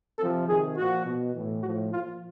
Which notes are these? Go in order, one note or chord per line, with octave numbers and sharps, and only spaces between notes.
C3 F3 A4
C3 D#3 G#4
A#2 F3 F#4
B2
A2 E3
A2 F3 F#4
A#2 F3 F4